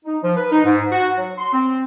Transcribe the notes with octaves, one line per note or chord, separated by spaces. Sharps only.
D#4
F3
B4
D#4
G#2
F#4
F#3
C6
C4